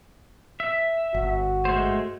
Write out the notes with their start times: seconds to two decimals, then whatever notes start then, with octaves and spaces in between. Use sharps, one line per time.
0.60 E5
1.14 G1 F#4
1.65 G#3 A3 C5